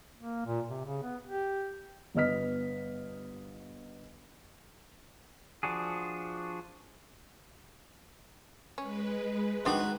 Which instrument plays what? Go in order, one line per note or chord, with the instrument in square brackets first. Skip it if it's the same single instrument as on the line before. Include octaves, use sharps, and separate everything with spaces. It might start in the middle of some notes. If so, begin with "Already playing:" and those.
[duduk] A#3
A#2
C3
C#3
B3
G4
[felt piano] G1 B3 D#5 F6 B6
[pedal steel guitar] F3 D4 F#4 G#4
[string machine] G#3 B4 [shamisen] C#4
[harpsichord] D#3 F#4 [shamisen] C4 D4 D#4